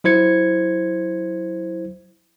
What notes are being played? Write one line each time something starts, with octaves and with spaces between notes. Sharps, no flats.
F#3 E4 C5 G#6 C#7